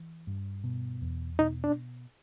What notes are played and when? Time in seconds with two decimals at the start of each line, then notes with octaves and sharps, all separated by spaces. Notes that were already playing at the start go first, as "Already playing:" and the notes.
Already playing: E3
0.27 G2
0.64 B2
1.02 E2
1.39 B2 D#4
1.64 D4